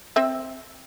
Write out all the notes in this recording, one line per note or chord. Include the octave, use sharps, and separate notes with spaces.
C4 E5